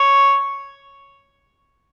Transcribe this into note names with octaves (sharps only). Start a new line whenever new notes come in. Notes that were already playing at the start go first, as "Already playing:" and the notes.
Already playing: C#5